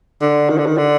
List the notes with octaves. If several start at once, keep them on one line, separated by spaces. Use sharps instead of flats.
D3
D#3
D3
D#3
D3